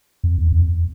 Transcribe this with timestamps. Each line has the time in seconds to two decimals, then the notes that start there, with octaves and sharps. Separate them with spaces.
0.24 F2
0.38 E2
0.52 E2
0.62 F2